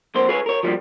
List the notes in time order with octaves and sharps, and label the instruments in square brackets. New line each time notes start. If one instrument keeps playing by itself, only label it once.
[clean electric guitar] F2 A#3 C5
G#4 B4 C#5
A#4 C#5
F3 G3 A#3